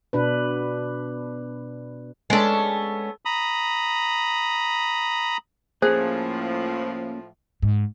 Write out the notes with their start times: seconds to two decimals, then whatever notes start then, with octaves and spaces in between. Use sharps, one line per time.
0.13 B2 D4 B4
2.30 G#3 B3 C#4 D4 A4
3.25 A#5 B5 D#6
5.82 A2 F3 A#3 C#4 G#4 C5
7.62 G#2